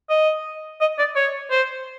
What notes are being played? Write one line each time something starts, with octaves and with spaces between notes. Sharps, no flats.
D#5
D#5
D5
C#5
C5